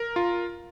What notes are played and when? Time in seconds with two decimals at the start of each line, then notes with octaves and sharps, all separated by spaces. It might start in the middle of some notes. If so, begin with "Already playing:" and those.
Already playing: A#4
0.16 F4